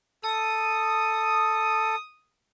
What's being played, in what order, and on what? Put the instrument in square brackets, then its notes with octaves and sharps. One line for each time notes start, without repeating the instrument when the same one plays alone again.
[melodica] A4 [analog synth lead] D#6